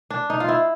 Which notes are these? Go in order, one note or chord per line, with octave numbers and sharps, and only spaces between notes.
D4
D#4
F4
E4